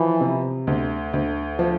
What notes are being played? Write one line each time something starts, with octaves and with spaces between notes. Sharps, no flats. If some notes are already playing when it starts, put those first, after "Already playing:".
Already playing: E3 F3
C3
D2
D2
F3